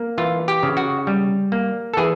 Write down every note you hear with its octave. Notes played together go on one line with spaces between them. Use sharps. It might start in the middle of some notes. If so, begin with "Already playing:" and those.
Already playing: A#3
E3 F4
G4
C#3
F#4
G3
A#3
A4
E3 G#4